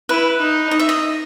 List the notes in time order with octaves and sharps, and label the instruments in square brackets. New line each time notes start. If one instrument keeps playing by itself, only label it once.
[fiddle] E4 [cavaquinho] B4
[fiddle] D#4
[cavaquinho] D#5
E5
D#5